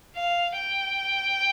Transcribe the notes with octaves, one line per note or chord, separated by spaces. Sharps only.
F5
G5